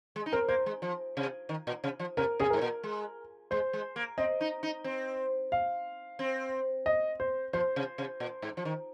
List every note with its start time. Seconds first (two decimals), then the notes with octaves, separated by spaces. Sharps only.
0.16 G#3
0.26 D#4
0.33 C4 A#4
0.48 A#3 C5
0.66 G#3
0.82 F3
1.17 C3
1.49 D#3
1.67 A#2
1.84 C3
1.99 F3
2.17 C3 A#4
2.39 C3 G#4
2.50 G#2 A#4
2.61 A#2
2.83 G#3
3.51 G#3 C5
3.73 G#3
3.96 A#3
4.18 C4 D#5
4.41 D#4
4.63 D#4
4.84 C4
5.52 F5
6.19 C4
6.86 D#5
7.20 C5
7.53 F3 C5
7.76 C3
7.98 C3
8.20 A#2
8.42 G#2
8.57 F3
8.65 D#3